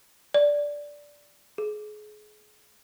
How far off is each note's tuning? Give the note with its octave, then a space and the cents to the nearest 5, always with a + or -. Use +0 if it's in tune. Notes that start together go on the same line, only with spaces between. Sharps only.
D5 -10
G#4 +30